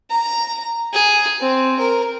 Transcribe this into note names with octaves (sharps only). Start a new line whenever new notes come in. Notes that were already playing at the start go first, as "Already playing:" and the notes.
A#5
G#4
C4
A#4